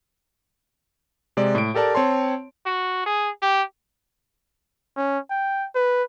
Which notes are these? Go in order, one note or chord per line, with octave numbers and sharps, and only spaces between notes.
C3 G#3 D5
A2 D7
G4 A4 A#4 D5 A5
C4 C#5 A5 C6
F#4
G#4
G4
C#4
G5
B4